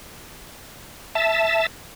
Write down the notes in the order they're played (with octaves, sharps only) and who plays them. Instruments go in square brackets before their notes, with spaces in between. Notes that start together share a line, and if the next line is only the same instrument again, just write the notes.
[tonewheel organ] E5 A5